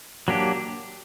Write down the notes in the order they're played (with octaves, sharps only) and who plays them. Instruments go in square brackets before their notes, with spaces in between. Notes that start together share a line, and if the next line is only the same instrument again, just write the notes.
[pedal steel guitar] F#3 A#3 D4 G4